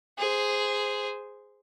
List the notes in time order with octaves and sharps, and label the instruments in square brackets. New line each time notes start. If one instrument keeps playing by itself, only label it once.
[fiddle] G#4 C5